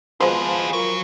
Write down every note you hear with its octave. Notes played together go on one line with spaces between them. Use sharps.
B2 F3 G#3 G#4 B4 C5
F#3 F4 A#4